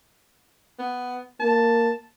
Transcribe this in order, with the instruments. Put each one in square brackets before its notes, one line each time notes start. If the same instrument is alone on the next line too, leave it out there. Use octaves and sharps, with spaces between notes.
[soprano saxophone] B3
[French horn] A#3 [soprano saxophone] A5